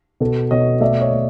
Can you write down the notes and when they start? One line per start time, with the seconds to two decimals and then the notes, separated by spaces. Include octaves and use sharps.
0.20 B2 A4
0.51 B2 C#5 D#5
0.81 A3 D5 E5
1.01 C#5 D#5
1.12 A3